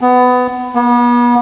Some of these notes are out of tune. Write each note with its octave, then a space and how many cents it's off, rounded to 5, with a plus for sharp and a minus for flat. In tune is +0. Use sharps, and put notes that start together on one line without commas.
B3 +20
B3 -35